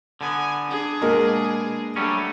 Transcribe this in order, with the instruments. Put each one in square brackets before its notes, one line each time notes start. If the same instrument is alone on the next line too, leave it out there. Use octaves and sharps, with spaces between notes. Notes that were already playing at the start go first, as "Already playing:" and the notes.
[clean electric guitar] D3 B3 [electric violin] G#5
[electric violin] D4 G#4
[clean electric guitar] B2 [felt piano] G#3 A#3
[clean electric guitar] F#3 G3 C#4 [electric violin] A3 D4